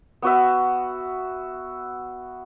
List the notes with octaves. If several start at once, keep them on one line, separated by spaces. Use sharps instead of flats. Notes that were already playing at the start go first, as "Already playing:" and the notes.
B3 F#4 E5